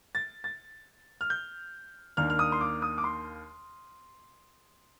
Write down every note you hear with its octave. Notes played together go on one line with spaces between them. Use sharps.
A6
A6
F6
G6
D#2 D#3 A#3 D4 F6
F6
D#6
C6
D6
D#6
D6
C6